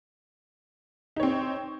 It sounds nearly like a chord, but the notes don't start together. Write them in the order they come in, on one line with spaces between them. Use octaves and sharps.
D#4 C#5 C4